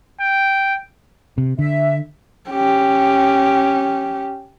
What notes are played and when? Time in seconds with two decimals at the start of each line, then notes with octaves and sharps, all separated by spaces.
0.20 G5
1.38 C3
1.59 D3 E5
2.50 C#4 G4